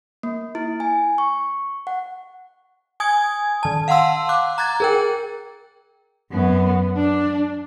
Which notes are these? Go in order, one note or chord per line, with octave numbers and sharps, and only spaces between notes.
A#3
E4
G#5
C#6
F#5
G#5 D#6 G#6
D#3 A5
F5 F#5 A5 C6 E6
D6 F#6
A#5 F#6 G#6 A6
G#4 A#4 G5
F#2 B3
D4